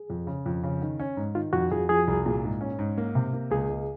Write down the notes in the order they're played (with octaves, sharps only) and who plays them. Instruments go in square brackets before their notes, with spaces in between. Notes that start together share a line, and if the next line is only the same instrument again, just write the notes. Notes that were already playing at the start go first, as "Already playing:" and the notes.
Already playing: [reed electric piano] G#4
[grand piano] F2
C#3
F2
C#3
D#3
C#4
G#2
[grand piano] D#3 [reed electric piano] F4
[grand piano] F2 [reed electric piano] F#4
[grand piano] F2 [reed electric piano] G#4
[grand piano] F3 [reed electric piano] G#4
[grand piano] C2
A#2
G#2
C#4
G#2
A#3
C3
A#3
[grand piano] C#2 [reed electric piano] G#4
[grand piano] C#2